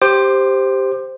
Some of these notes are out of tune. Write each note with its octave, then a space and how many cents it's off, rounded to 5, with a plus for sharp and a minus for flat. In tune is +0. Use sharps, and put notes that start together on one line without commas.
G4 +0 C5 +0 D6 +30